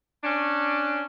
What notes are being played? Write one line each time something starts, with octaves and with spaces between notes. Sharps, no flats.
C#4 D4